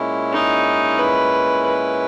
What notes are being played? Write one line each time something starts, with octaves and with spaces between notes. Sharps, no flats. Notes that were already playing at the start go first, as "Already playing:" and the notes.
Already playing: A#2 G#3 C#4 E4
D#4
B4
B4